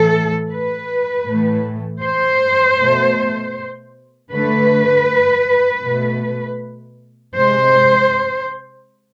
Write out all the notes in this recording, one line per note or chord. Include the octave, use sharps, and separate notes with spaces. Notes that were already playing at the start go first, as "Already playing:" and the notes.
Already playing: A2 E3 A3 A4
B4
A2 E3 A3
C5
B2 A3
D3 A3 B4
B2 A3
C3 G#3 C5